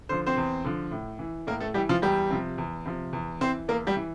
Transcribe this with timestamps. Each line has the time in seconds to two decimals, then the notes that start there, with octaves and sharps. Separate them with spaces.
0.09 D3 F3 C5
0.26 C4 C5
0.37 E2
0.65 D3 F3
0.91 A2
1.19 E3
1.47 A2 A#3 A#4
1.60 A3 A4
1.74 E3 G3 G4
1.89 F3 F4
2.02 E2 G3 G4
2.30 C3 F3
2.58 E2
2.86 C3 F3
3.13 E2
3.41 E3 C4 C5
3.68 E2 A#3 A#4
3.87 G3 G4
3.96 E3